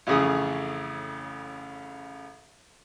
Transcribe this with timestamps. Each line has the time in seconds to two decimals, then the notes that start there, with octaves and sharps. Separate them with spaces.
0.07 A1 F2 C#3 G#4 D#6